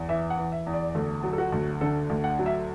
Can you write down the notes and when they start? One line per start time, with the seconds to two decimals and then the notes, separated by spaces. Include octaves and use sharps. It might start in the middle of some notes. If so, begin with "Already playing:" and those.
Already playing: E2
0.09 E3 E5
0.30 F#5
0.37 E3
0.52 E5
0.66 E2
0.74 D5
0.95 D2 A4
1.23 F#3
1.33 A4
1.38 F#4
1.52 D2
1.81 D3 A4
2.10 D2
2.24 F#5
2.39 F#3
2.46 E5